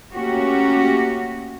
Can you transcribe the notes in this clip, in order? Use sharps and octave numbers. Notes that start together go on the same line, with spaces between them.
A3 A#3 C#4 F#4 G4